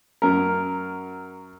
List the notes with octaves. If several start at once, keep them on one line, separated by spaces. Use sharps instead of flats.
F#2 A#4